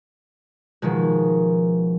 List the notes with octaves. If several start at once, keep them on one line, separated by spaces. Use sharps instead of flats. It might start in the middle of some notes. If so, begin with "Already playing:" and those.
B2 D#3 F3 G#3